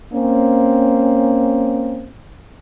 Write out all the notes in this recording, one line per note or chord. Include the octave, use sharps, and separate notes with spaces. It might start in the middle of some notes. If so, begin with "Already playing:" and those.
A#3 C4 C#4